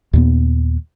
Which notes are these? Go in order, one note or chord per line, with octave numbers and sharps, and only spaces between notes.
D#2 A#2 B3